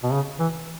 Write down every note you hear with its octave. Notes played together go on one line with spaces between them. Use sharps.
B2
C#3
E3